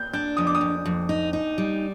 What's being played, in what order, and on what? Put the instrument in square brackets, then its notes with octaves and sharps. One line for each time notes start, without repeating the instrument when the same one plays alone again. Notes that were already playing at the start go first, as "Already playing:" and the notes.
Already playing: [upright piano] G6
[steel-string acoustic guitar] D4 [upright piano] G6
[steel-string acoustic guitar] F2 [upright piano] D#6
[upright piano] D6
D#6
[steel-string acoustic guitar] F2
F2
D#4
D#4
G3